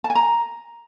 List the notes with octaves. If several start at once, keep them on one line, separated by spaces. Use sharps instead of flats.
A5
G#5
A#5